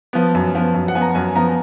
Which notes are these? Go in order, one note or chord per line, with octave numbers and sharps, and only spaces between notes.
F3 B3
F#2
F3 B3
F#2
F#5
F3 B3 G#5
A#5
F#2 G#5
F3 B3 A#5